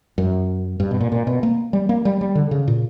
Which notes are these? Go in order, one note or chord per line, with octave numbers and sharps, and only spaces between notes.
F#2
G2
B2
A#2
A#2
B2
A#3
G3
A#3
G3
G3
D3
C#3
A#2